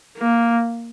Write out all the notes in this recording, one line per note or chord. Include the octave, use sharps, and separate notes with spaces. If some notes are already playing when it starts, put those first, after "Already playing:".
A#3